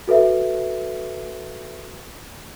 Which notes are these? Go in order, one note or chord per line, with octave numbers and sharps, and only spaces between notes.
F#4 A4 B4 E5